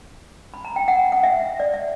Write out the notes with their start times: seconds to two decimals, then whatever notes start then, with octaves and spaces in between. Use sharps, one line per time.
0.54 B5
0.65 A#5
0.76 G5
0.88 F#5
1.12 F#5
1.23 E5
1.60 D5
1.74 E5